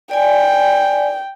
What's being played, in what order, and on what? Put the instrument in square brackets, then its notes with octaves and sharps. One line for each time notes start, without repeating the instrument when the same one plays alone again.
[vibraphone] D5 G#5 [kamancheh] G5